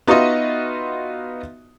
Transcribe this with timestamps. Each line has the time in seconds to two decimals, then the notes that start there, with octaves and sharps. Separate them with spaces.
0.07 B3 D#4 F4 F#4 D#5 E5